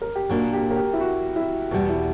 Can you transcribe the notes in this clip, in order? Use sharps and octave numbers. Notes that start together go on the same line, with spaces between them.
A#4
G4
A#2 A#3 D4 F#4
G4
A#4
G4
E4
F#4
E4
E2 B2 G3 F#4
E4